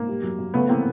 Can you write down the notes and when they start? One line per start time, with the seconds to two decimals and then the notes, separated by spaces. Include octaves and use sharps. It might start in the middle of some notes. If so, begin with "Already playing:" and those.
Already playing: G#2 A#3
0.08 G3
0.23 F#2
0.39 F#2
0.54 C#3 A3 B3
0.69 E3 A#3 C4